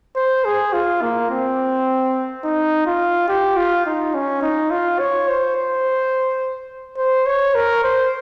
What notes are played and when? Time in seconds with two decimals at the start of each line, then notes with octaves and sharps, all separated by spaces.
0.16 C5
0.45 G#4
0.73 F4
1.02 A#3
1.31 C4
2.44 D#4
2.86 F4
3.28 G4
3.57 F4
3.86 D#4
4.14 C#4
4.42 D#4
4.71 F4
4.99 C#5
5.28 C5
5.56 C5
6.97 C5
7.26 C#5
7.55 A#4
7.83 C5